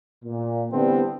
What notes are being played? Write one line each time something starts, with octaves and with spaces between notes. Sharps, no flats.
A#2
D3 E3 G3 A3 B3 C4